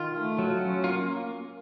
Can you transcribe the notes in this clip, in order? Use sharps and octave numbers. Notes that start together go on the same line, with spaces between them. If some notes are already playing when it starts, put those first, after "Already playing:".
Already playing: D#3 F4
A3
F#3
C#4
A#3 F4